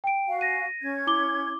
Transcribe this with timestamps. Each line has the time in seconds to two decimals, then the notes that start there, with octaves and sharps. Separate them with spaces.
0.04 G5 D7
0.27 F#4 F5 G#5
0.41 A#6 D#7
0.82 C#4 G#6
1.07 E4 D6 G7